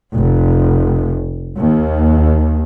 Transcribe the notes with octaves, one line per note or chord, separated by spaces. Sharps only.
F1
D#2